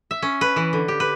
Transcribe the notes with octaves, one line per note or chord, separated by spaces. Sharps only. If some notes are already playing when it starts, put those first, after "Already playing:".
E5
C#4
B4
E3
D3
G4
B4